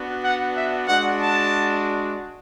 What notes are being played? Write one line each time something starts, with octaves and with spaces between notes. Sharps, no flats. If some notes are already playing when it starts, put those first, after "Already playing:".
Already playing: B3 D4 F#4
F#5
E5
G#3 D4 F#4 F#5
A5